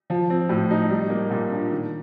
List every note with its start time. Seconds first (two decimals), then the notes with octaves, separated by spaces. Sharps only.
0.10 F3
0.30 C4
0.49 A2
0.71 D#4
0.90 G3
1.10 A#3
1.30 A#2
1.51 D4
1.71 D#3